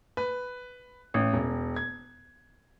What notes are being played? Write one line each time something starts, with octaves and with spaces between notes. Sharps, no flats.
B4
A1
E1
G#6